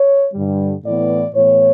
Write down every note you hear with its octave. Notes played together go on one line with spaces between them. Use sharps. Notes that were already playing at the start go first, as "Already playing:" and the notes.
Already playing: C#5
G2 D3 G3
A2 E3 B3 D5
A2 E3 B3 C#5